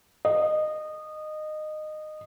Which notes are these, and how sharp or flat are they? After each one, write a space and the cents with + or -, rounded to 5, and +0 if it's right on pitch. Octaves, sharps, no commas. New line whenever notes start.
D#5 -20